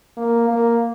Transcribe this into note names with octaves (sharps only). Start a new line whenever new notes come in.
A#3
A#3